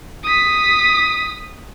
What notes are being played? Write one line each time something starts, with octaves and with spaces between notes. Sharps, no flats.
D#6 B6